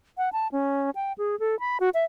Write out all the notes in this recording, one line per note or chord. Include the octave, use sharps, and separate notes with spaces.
F#5
A5
C#4
G5
G#4
A4
B5
F#4
E5